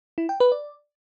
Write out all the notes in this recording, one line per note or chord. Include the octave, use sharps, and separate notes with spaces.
E4
G5
B4
D5